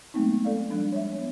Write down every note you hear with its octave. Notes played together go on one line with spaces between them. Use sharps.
F#3 G#3 A3 B3 C4 D#4
A4 D5 F5
F3 G3 G#3 D4
C#5 E5
B3